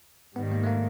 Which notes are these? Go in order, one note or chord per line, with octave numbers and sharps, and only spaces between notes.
G#2 D#3 G3 B3
A#3
A3
A#3